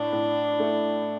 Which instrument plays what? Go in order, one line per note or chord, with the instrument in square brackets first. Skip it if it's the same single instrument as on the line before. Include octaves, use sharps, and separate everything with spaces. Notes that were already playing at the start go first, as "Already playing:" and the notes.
Already playing: [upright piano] A2 [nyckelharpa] D4
[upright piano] A2
A3